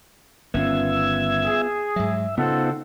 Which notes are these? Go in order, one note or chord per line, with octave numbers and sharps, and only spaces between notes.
G1 D#3 B3 C#4 F4 E5 E6 G#6
G#4
G#2 F#3 E5
C#3 B3 C4 D#4 F4 A4 C5 F#5